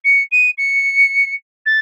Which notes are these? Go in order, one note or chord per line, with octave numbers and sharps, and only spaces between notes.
C#7
D#7
C#7
A6